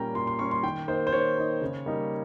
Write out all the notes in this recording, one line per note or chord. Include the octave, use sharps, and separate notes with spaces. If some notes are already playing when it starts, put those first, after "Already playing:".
Already playing: A#2 G3 A#3 C#4 G5 A#5
A#2 C6
C6
G3 A#3 C#4 C#6
C6
D#3 G5
A#3 D#4 C5
C5
D#3 C#5
A#3 D#4
C#3
G3 A#3 D#4